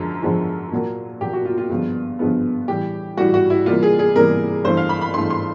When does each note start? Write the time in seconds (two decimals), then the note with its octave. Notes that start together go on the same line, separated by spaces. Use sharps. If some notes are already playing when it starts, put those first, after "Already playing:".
Already playing: F#2 D3 F3 G#3 F4
0.22 F#2 D3 F3 G#3
0.72 A#2 F#3 A#3
1.21 A#2 F#3 A#3 G4
1.33 F#4
1.45 F4
1.58 F4
1.70 G2 D3 F3 G#3 B3
2.19 G2 D3 F3 G#3 B3
2.68 A2 E3 G3 G4
3.17 A2 E3 G3 F#4
3.34 F#4
3.50 E4
3.66 C3 E3 G3 A#3 F4
3.83 G#4
3.99 G#4
4.16 C3 E3 G3 A#3 A#4
4.64 G2 E3 A3 C5
4.77 F5
4.89 B5
5.01 B5
5.14 G2 E3 A3 C6
5.30 C6